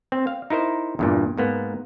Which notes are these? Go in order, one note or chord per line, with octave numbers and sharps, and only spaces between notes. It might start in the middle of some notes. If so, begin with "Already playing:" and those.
C4
F5
D#4 E4 A#4 C5
E2 G2 A#2
G#2 A#3 B3